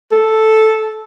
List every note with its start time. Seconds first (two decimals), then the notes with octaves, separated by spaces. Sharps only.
0.12 A4